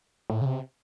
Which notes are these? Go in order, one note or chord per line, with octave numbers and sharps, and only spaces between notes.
A2
C#3
C3